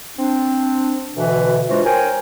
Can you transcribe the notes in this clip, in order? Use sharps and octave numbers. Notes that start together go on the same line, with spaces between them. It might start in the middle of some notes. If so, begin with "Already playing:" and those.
C4 D4
D2 B2 D3 E3 B4 E5
E3 G#3 D4 F4 F#4 C5
A#4 C5 C#5 G5 G#5